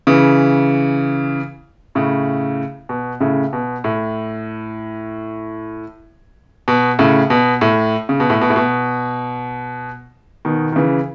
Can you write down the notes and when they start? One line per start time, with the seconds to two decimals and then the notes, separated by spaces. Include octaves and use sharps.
0.07 C#3 E3
1.95 A2 C#3
2.89 B2
3.20 A2 C#3
3.53 B2
3.84 A2
6.68 B2
6.99 A2 C#3
7.30 B2
7.61 A2
8.09 C#3
8.20 B2
8.30 A2
8.41 B2
8.50 A2
8.56 B2
10.45 B2 D#3
10.72 D#3
10.76 C#3 E3